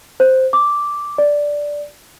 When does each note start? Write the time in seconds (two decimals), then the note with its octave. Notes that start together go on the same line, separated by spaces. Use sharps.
0.20 C5
0.53 D6
1.18 D5